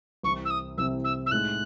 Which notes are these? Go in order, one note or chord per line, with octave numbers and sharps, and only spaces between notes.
C2 C3 E3 C4 C#6
E6
D#6
C2 C3 E3 C4 E6
E6
E6
A2 G#3 D#4 F#6